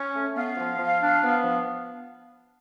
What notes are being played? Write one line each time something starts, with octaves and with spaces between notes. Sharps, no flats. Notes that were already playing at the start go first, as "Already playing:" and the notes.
Already playing: C#4
A3
B3 F5
F3
F3
D4
B3
F3